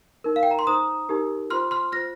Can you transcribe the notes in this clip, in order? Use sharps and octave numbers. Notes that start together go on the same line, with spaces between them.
D#4 A#4
F5
G5
A#5
C6
D#4 C5 A#5 D#6
D#4 G4 A#4
F4 C5 C6 F6
C6 F6
F4 C5 F6 A#6